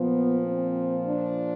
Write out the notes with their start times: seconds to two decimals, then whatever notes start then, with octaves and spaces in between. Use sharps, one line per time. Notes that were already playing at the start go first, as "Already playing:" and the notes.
Already playing: A#2 F3 B3
0.44 C4
1.05 D4